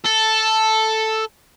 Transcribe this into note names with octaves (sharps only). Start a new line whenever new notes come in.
A4